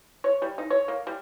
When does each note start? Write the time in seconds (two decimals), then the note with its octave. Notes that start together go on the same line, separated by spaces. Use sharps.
0.24 C#5
0.42 G3
0.58 D#4
0.70 C#5
0.88 A#3
1.07 G3